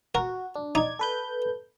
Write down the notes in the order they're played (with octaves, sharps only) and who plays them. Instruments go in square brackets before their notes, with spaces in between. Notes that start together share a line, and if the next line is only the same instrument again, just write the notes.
[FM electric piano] F#4 [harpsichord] A#4
[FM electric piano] D4
[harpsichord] D#4 [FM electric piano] D5 G#6
[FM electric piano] A4 B4 G6